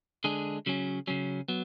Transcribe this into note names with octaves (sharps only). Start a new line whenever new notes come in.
D3 G#3 D4 G#4
C#3 F#3 C#4
C#3 F#3 C#4
F#3 B3